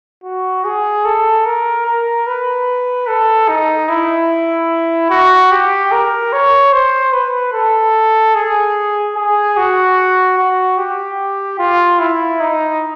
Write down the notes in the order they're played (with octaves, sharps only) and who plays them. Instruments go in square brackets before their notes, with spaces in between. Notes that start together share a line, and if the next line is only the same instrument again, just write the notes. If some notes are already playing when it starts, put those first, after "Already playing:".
[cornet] F#4
G#4
A4
A#4
A#4
B4
A4
D#4
E4
F#4
G4
A#4
C#5
C5
B4
A4
G#4
G#4
F#4
F#4
G4
F4
E4
D#4